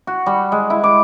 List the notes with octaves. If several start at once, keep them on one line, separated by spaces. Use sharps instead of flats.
F#4
G3
G#3
E4
D6